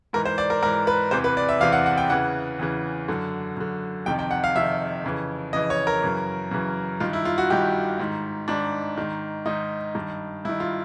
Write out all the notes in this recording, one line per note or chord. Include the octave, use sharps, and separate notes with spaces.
G#2 E3 A#4
C5
D5
A#4
G#2 E3 A#4
B4
E2 C3 E3 C5
B4
D5
E5
E2 C3 E3 F5
F#5
F#5
G5
E2 C#3 E3 F#5
E2 C#3 E3
F#2 D3
F#2 D3
F2 C3 D#3 G5
G5
F#5
F5
F2 C3 D#3 E5
F2 C#3 E3
F2 C#3 E3 D#5
C#5
A#4
F#2 C#3 E3
F#2 C#3 E3
G2 D#3 F4
E4
F4
F#4
G2 D#3 G4
G#2 D#3
G#2 D#3 D4
G#2 D#3
G#2 D#3 D#4
G2 D#3
G2 D#3 E4
F4